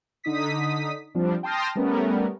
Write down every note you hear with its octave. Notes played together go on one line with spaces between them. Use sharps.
D3 D#4 D#6 B6
F3 G3 C4 D4
G5 A5 C6 D#6 F6 A#6
G3 A3 B3 C#4 A#4